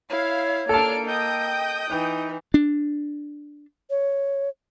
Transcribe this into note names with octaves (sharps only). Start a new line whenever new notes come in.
E4 C#5 F5
A#3 D4 A4 A5 F6 D7
D#5 G5 D#6 G6
E3 D#4
D4
C#5